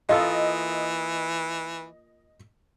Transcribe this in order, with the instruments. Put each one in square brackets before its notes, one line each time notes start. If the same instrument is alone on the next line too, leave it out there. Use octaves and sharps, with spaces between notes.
[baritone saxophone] E3 [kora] A#3 F4 A4 [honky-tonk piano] D#5 D#6